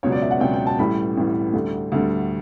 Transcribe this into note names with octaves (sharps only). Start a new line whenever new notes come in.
C#2 B2 F#3 C#5
D5
E5
F#5
C#2 B2 F#3 G5
G5
A5
A1 A2 E3 G3 B5
A1 A2 E3 G3
D2 D3 G3
D2 D3 G3